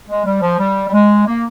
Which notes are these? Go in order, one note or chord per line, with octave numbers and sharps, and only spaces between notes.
G#3
G3
F3
G3
G3
G#3
A#3